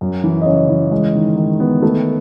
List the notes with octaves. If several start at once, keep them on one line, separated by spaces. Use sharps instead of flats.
F#2
E3
D#5
C#3 C#5
E3
G#3
D#3
D#3
B3
A3